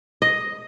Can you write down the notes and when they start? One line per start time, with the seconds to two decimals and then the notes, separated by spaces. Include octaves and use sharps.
0.22 D#5